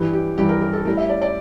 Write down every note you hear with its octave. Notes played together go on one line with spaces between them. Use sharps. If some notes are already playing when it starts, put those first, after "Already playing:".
Already playing: G2 E3 G3
G4
G2 E3 G3 G4
A#4
A#4
A4
A2 G3 A#4
E5
D5
D5